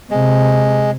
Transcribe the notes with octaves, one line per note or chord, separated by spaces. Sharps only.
C3 G#3